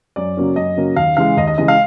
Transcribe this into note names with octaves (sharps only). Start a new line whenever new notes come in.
F#2 D5
C#3 F#3 A#3 C#4
F#2 D#5
C#3 F#3 A#3 C#4
D#2 F5
C#3 E3 G#3 F5
D#2 D#5
D#5
C#3 E3 G#3 D#5
F5